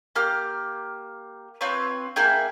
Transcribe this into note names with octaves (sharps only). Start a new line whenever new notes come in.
A#3 G4 F6
C4 F4 B4 C#5
A#3 E4 G#4 G5